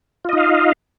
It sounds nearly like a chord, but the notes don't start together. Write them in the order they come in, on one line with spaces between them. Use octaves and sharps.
F4 D#5 D#4 F5